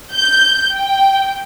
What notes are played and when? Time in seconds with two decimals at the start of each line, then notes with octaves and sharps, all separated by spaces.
0.13 G6
0.74 G5